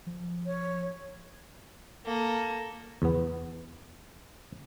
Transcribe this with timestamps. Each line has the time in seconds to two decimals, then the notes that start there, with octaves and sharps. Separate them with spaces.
0.06 F3
0.46 C#5
2.05 A#3 A4
3.02 E2 B3